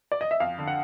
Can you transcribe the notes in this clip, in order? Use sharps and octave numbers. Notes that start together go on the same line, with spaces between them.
D5
D#5
E5
F2 F5
D3
F#5